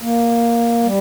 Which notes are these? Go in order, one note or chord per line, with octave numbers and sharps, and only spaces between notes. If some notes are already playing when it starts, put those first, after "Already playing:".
A#3
G3